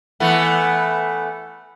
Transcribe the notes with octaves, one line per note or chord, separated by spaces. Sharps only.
E3 A3 B3